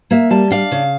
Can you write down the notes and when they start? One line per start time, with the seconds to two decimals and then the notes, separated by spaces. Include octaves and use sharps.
0.11 A#3 E5
0.30 G3 A5
0.51 D4 F5
0.72 C#3